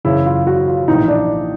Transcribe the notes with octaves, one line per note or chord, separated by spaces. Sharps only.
F#1 F#2 C#3 E3 E4
F4
F#4
F4
A#1 A2 E3 D#4
D4